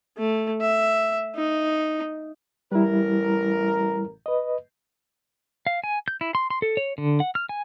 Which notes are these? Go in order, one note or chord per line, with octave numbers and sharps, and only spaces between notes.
A3
E5
D#4
A1 G3 E4 A#4
B4 D#5
F5
G#5
G6
E4
C6
C6
A4
C#5
D3
F#5
F6
G#5